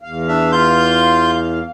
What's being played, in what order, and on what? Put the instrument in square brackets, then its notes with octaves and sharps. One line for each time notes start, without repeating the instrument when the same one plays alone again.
[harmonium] E2 F5
[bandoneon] D4 E5
F4 C6 G6